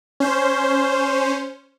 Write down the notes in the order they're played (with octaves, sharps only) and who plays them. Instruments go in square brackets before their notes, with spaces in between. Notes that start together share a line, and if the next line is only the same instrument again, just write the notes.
[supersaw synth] C#4 C5